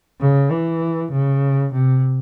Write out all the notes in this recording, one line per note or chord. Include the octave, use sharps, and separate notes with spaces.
C#3
E3
C#3
C3